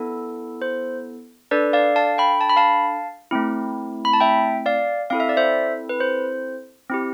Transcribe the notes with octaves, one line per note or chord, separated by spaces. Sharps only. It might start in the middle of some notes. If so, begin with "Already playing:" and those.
Already playing: B3 E4 A4
C5
D4 A4 B4 D5
D5 F5
F5 A5
G5 B5
A5
B5
F5 A5
A3 C4 E4
B5
A5
E5 G5
D5 F5
C4 E4 A4 F5
E5
D5
C5 E5
B4
C5
C4 E4 G4